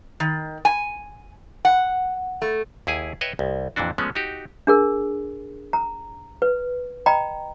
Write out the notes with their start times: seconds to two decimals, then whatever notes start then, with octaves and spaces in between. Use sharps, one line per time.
0.20 D#3
0.65 G#5
1.65 F#5
2.42 A3
2.87 D#2 E4 G#4 G#5
3.21 B4 C#5 D#5 E5 G5
3.39 C2
3.76 F2 A#2 E3 D4 F#4
3.98 F3 G#3 A3 B3 C#4
4.15 D#4 F#4 G4
4.67 D4 G#4 A#4
5.73 A#5
6.42 B4
7.06 D#5 G5 A#5 B5